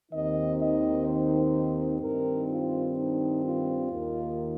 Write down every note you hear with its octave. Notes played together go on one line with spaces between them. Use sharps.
D#2 D#3 C4 D#4 D#5
D#5
C5
G2 D#3 C4 D#4 A#4
F4
D#4
F4
D#2 D#3 A#3